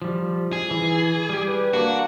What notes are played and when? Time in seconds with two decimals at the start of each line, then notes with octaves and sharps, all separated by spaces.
0.02 F3 G3
0.53 G#4
0.71 E3
1.29 G3 G4
1.48 B4
1.73 A#3 D4 F#4